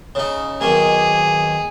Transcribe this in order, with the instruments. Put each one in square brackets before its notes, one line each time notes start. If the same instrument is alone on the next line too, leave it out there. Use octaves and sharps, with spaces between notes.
[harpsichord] C#3 D#4
[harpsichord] B1 D#3 A#3 [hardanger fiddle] G#4